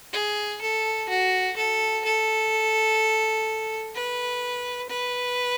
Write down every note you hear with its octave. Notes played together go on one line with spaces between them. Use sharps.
G#4
A4
F#4
A4
A4
B4
B4